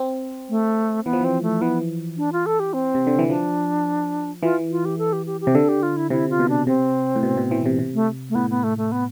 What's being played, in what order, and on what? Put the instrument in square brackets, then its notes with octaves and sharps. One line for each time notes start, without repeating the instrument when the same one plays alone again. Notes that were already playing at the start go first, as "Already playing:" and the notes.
Already playing: [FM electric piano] C4
[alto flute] A3
[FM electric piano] E3 [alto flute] B3
[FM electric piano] F3
[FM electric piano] E3 [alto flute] C4
[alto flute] A3
[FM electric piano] E3 [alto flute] B3
[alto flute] D4
F4
A4
G4
C4
[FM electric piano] C3
D3
E3
[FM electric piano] F3 [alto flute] D4
[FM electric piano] E3 [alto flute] F4
[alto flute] F4
G4
A4
G4
G4
G4
[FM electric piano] C3
[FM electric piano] D3 [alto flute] A4
[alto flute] G4
F4
E4
[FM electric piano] C3 [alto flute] E4
[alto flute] F4
[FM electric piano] B2
[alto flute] D4
[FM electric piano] C3 [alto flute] C4
[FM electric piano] A2
B2
B2
E3
C3
C3
[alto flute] A3
A3
[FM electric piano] A2 [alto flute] B3
[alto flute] B3
A3
A3
B3